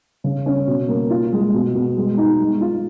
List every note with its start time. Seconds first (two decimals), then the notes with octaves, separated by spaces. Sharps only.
0.24 C#3
0.46 C#4
0.67 B2
0.88 A#3
1.10 F4
1.32 G#3
1.54 B2
1.75 B2
1.97 G#3
2.17 D#4
2.40 G#3
2.61 F4